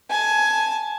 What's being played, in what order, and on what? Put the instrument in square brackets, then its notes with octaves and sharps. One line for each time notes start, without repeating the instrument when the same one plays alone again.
[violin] G#5 A5